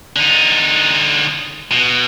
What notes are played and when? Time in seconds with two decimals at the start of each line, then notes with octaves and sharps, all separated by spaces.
0.16 D3 D#4
1.72 B2